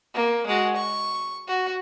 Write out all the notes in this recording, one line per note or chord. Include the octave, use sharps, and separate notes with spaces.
A#3
G#3 F#4
C#6
F#4